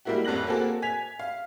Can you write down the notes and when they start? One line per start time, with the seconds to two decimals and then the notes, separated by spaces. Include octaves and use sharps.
0.05 G3 G#3 A#3 E4 F#4
0.25 A1 F2 F#6 A#6 F#7
0.47 A#3 C4 F#4 G#4 A4
0.82 G#5 G#6 B6 F7
1.19 F5